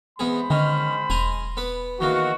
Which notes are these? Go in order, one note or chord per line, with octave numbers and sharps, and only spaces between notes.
E2 G#3 B3 G#4 C5 B5
D3 D#3 C#4
E1 G#5 A#5 C6
B3 B4
E2 D#3 A#3 F#4